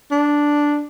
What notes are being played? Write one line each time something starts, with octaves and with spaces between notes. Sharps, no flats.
D4